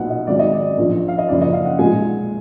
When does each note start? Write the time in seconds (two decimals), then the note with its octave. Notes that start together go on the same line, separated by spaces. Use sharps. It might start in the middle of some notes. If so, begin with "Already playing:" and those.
Already playing: B1 A#2 F#3 B3 F#5
0.10 D#5
0.27 G#1 G#2 F#3 D5
0.39 D#5
0.53 D5
0.78 A#1 A#2 F3 A#3
1.08 F5
1.18 D#5
1.28 F#1 F#2 F3 D5
1.41 D#5
1.53 F5
1.65 F#5
1.79 B1 A#2 G#3 G#5